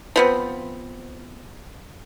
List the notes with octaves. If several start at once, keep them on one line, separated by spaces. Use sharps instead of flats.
F3 B3 C4